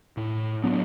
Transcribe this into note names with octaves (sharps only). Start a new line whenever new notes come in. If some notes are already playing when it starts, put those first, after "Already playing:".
A2
F#3 B3 D4